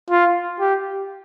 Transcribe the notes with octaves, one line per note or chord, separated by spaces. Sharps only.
F4
G4